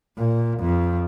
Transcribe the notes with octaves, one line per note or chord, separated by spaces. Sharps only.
A#2
F2